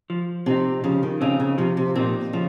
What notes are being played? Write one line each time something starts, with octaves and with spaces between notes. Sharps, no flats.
F3
C3 C4 D#4
C#3 F3
D#3
C#3 C4 D#4
C#3
C3 F3
C3
A#2 C4 D#4
C#3 F3